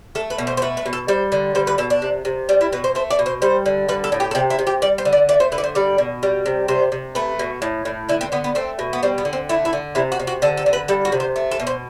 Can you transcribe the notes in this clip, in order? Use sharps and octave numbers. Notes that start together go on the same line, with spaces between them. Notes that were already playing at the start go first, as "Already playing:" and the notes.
A3 A4
B4
B2
C5
C5
A3 B4
B4
B2
A4
G3 C5
D3
G3 C5
B4
B2 A4
D4
C3
C3
G3 D4
E4
B2 B4
C5
A3 C5
D5
B2
C5
G3 C5
D3
G3 B4
A4
A2
G4
A4
C3 G4
E4
C3
G4
G3 D5
C5
D3
D5
A3 D5
C5
D3 B4
D5
C5
G3 D5
B2
G3
C3
C3 C5
C3
A3 B4
B2
A2
A2
D3 E4
C4
D3 B3
B3
A3 C4
B2
B3
G3 C4
B3
D3
C4
A3 E4
E4
D3
C3 E4
F#4
C3
F#4
D3 A4
A4
D3
B4
G3 A4
F#4
C3
C5
A3
A4
B2
C5